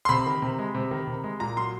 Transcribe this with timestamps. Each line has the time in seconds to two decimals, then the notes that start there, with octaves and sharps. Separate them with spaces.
0.05 C6
0.09 C3 B5
0.26 D#3
0.42 C3
0.58 G#3
0.75 C3
0.91 D#3
1.07 C3
1.24 G#3
1.40 A#2 A#5
1.57 F#3 C6